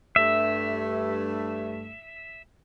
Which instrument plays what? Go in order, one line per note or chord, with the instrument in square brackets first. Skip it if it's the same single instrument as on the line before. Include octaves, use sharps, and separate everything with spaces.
[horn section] G2 A3 [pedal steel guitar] E5